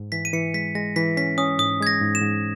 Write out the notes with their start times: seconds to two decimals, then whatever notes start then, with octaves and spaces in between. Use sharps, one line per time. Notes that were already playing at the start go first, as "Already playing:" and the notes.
Already playing: G#2
0.12 E3 B6
0.25 D#7
0.33 E3 C#7
0.54 G#3 B6
0.75 G#3 A#6
0.96 E3 B6
1.17 C#4 B6
1.38 C#4 D#6
1.59 G#2 D#6
1.81 G#3 G#6
1.87 A#6
2.01 G#2
2.15 E7
2.22 G#2